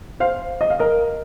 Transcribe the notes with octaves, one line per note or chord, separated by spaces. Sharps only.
C5 F5
D#5
F5
A#4 D#5